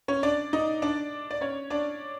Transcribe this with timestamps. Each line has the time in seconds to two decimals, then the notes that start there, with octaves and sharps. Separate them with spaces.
0.08 C#4 C#5
0.23 D4 D5
0.53 D#4 D#5
0.82 D4 D5
1.31 D5
1.41 C#4 C#5
1.70 D4 D5